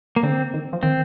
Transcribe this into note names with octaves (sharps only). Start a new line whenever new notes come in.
A#3
D3 C4
D#3
F3
D#3 C4